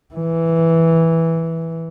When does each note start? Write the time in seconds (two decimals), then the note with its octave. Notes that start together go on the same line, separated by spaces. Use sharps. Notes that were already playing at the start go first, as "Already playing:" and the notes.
0.14 E3